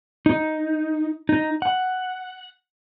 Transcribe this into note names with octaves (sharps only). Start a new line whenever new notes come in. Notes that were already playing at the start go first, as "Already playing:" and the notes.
D#4
D#4
F#5